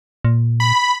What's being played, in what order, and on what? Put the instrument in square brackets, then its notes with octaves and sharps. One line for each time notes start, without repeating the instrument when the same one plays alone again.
[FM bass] A#2
[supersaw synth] B5